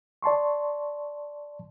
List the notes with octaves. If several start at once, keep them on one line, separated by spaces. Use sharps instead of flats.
D5 A5 C6 C#6